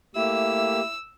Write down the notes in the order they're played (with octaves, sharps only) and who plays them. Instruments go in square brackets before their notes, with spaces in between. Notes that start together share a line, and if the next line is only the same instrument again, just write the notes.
[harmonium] A3 A#3 G4 [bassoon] E4 [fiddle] E6